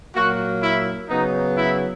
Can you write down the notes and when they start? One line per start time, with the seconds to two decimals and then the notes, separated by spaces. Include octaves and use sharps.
0.15 A#2 F#3 A#3 F#4
0.63 E4
1.10 C#3 F#3 B3 D#4
1.57 E4